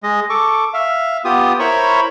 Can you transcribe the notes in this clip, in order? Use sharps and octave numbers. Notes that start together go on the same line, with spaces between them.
G#3 D#5
A4 C#6 D6
E5 F5
B3 F4 G4 D#6
E4 A#4 C5 C#5 B5 C#6